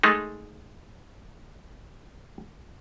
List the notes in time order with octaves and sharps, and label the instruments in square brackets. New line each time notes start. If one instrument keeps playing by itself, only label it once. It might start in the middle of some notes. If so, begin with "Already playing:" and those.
[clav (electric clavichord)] G#3 A3 D#4